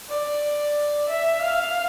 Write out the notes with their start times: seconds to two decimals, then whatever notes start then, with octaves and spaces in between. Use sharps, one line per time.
0.10 D5
1.09 E5
1.42 F5